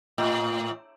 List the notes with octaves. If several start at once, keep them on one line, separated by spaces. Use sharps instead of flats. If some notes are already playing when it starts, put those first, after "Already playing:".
A2